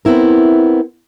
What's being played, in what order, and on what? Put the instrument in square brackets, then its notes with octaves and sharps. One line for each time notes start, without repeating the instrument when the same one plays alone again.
[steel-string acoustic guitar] B3 C4 E4 A#4